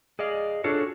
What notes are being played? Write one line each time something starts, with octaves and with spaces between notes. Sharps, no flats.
G#4 D5 D#5 F5
D4 F4 F#4 G#4 A4 C#5